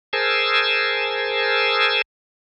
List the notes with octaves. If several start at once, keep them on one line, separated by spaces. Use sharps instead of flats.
G#4 A#4 C5 G#5 A5 E6